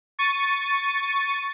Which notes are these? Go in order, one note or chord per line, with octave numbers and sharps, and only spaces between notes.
C#6 A6 D#7